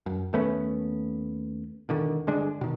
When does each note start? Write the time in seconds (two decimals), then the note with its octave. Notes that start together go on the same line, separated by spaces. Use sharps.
0.06 F#2
0.33 D#2 A3 B3 C#4
1.89 E1 D3 D#3
2.27 G1 D3 G#3 D4
2.61 B2 D#3